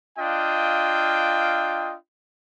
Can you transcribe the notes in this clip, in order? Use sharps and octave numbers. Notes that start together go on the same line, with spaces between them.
D4 F4 D#5 F5 G5